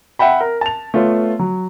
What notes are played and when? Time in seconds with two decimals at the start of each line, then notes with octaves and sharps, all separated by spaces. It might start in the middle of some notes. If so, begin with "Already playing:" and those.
0.19 E5 F#5 G5 B5
0.40 A#4
0.61 A5 F7
0.94 A3 B3 F4 C#5
1.39 F#3